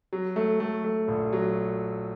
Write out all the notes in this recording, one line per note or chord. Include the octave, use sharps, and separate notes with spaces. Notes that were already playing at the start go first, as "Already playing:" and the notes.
F#3
A3
A3
A3
A#1
F#3